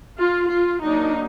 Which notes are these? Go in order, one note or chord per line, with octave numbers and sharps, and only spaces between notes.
F4
F4
F#3 A#3 D4 D#4